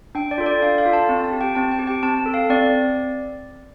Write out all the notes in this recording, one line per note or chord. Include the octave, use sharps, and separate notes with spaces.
D4 G5
D5
F4 A4
D5
D4 F5
F5
F4 A4
A5
C4
A5
G4
G5
C4 A5
G5
G4
G5
C4 A5
A4
F5
C4 D5